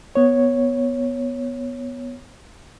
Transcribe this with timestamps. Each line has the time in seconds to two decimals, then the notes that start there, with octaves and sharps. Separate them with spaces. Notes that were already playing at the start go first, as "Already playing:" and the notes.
0.15 B3 C#5